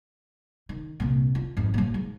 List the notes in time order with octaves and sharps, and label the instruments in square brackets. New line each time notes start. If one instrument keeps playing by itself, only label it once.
[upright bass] D#3
C2 A#2
F4
G#1 F2
A#2 F#3
G#2